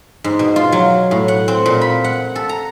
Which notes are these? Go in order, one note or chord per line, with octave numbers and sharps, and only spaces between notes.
G#2
B2
F4
F#3
A2
F#5
C4
A#2
B5
F#5
A4
A#5